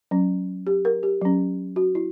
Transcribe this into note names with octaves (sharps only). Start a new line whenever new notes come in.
F#3 C#4
G4
A#4
G4
F#3 C#4
F#4
E4